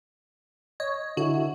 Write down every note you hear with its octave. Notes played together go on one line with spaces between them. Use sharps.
C#5 D#5
D3 E4 F#4